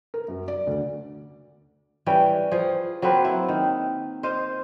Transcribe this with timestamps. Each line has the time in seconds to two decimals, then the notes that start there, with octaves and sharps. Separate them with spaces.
0.14 A#4
0.28 F#2
0.48 D5
0.67 D2
2.06 E3 G3 C#4 G5
2.51 F3 G#4
3.02 F#3 A#3 C4 B4
3.25 E4
3.48 D#3
4.23 C5 D#5 F5